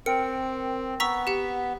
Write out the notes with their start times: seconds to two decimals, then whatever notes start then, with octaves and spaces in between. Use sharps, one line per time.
0.06 C4 A#4 G5 C#7
1.00 B3 A#5 C#6 E6 B6
1.27 G4 F#5